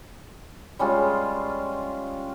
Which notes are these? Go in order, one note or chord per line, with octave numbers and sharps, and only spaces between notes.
G3 G#3 C#4 F4